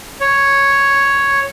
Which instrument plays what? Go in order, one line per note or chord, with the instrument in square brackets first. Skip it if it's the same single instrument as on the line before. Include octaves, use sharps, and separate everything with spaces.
[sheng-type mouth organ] C#5